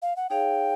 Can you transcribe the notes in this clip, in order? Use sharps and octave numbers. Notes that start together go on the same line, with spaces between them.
F5
F#5
D#4 G#4 C#5 F5 G5